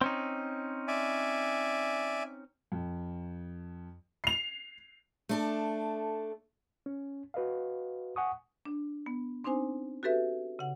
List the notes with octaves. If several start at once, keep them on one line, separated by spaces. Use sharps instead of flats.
C4 C#4 D#4
D5 E5 G#5
F2
C7 F7
A3 D4 A4
C#4
F#4 B4 D#5 F5
F#5 G#5 C#6 D#6
D4
B3
C4 D4 D#4 C5 G#5
F#4 G4 A4 B4 E5
C#3 F#5